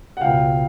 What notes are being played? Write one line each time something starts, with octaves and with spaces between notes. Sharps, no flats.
F#5
C#2 B2 F5 G5